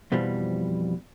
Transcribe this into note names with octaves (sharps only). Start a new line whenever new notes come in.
F2 B2 E3 F3 G3